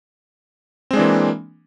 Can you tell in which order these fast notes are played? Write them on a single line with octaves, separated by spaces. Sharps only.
C4 G#3 D4 E3 A#3